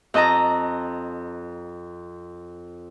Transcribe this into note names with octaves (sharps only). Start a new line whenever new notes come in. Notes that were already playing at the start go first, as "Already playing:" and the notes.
F2 D#5 A5 A#5